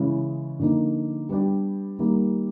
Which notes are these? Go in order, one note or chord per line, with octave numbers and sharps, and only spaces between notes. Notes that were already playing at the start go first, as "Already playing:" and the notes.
Already playing: C#3 E3 G#3 C#4
D3 F3 A#3 D#4
G3 B3 D4 G4
D#3 G3 A#3